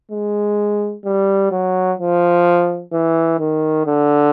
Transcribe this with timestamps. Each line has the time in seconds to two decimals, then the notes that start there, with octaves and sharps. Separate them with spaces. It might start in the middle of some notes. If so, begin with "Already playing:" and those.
0.11 G#3
1.05 G3
1.51 F#3
1.99 F3
2.92 E3
3.39 D#3
3.86 D3